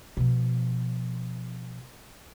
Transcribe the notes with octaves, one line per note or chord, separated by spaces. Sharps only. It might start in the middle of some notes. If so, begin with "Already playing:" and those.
B2 F3